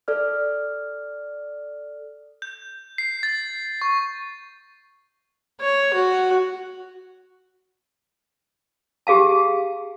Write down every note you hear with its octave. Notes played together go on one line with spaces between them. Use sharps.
A4 D5 F6
G6
C7
A6
C#6
C#5
F#4
G4 G#4 F5 A5